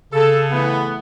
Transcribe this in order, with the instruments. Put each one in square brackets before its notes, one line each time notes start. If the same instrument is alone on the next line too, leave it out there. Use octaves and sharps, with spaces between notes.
[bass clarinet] C#3 [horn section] A4
[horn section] E3 A3 B3